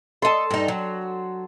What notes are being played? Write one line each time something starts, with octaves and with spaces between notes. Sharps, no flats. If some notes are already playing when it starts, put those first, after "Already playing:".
A4 D#5 A5 C6
G2 D#4
F#3